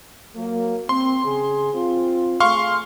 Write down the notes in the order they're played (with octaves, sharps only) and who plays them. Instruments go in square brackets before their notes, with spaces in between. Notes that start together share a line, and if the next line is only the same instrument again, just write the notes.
[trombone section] F#3 A#3
[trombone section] C4 [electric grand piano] C6
[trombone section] C#3 G#4
C4 F4
[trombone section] A3 G#4 [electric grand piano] F5 C6 C#6